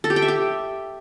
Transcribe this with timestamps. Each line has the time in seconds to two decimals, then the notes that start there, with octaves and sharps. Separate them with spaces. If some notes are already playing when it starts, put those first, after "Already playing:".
0.04 A4
0.10 G4
0.16 G5
0.22 E5
0.28 G4